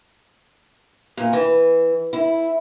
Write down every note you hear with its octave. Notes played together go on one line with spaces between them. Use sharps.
A#2
E3
E4